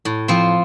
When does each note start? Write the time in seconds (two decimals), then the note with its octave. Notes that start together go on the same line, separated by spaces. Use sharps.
0.05 A2
0.28 F3 C4